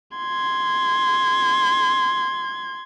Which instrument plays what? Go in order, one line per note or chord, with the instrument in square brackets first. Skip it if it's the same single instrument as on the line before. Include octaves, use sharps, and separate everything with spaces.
[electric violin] C6 G#6